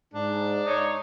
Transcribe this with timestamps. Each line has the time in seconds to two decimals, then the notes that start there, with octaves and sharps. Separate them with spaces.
0.13 G#2 D4
0.65 D#4 C#5